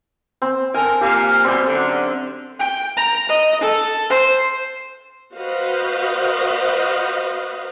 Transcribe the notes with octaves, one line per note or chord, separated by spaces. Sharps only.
C4
D3 C4 A#4 G#5 A5
A#2 A#3 G4 F5
B2 G3 C4 C6
F#2 D3
G5
A#5
D#5
A4
C5
F#4 B4 C5 D#5 F5